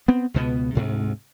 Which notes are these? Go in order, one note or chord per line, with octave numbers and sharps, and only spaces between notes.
B3 C4
C#2 B2 B3
D2 G#2 C3